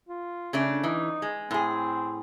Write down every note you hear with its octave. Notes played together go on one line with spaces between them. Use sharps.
F4
C#3 A3 D4
E3 D#4
G#3
A2 C4 G#4